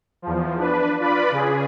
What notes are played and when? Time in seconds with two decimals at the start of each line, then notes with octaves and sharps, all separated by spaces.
0.22 E2 F3
0.58 D4 B4
1.00 F4 B4 D5 B5
1.31 C#3 G#4